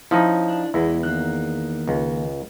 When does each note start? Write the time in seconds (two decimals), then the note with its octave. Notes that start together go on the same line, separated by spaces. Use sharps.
0.11 F3 C#4 D#4 E4
0.48 D4
0.74 E2 G#3 B3 E4
1.03 D#3 A#3 F#6
1.88 C#2